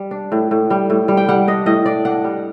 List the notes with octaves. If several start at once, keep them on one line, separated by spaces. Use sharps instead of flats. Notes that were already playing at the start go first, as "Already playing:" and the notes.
Already playing: G3
D4
A2
A2
G3
A2
G3
G5
G3 F#5
D4 D#5
A2 D#5
D4 D5
D4 F#5
G3